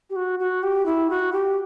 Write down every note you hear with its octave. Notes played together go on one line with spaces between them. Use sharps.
G4
F#4
F#4
G4
E4
F#4
G4